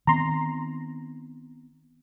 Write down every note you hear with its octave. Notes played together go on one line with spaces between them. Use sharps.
D#3 B3 C4 A#5 C6